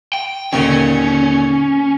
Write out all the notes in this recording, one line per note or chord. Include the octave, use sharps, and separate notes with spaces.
G5
D#2 A#2 D3 C#4